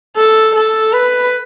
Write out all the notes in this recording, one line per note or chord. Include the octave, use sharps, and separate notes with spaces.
A4
A4
B4